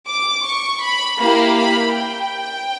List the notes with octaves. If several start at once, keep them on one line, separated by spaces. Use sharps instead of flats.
D6
C#6
B5
A#3 E4 G4 B5
B5
G5